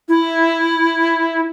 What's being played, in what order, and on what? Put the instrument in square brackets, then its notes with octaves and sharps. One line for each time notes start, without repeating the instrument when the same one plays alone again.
[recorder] E4